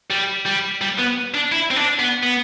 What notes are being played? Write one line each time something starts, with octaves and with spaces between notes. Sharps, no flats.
G3
G3
G3
B3
D4
E4
C4
D4
B3
B3